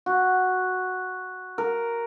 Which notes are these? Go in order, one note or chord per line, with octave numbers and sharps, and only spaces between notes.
F#4
A#4